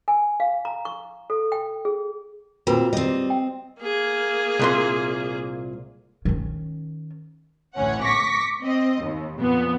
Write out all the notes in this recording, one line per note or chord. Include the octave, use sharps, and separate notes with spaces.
G#5
F5
A#5
C#6
A4
G5
G#4
A#2 C4 F4 F#4 A#4 B4
G3 C4 D#5
G5
A#3 G#4
C2 A#2 C6
D#3 C#4
A1 D2 C#4 F#5
C#6 D6 A#6 B6
C4 D#5
D#2
F2 A#2 B3